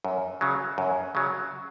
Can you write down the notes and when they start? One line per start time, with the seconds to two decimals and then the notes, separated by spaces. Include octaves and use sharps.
0.05 F#2
0.41 C#3 F#3
0.78 F#2
1.15 C#3 F#3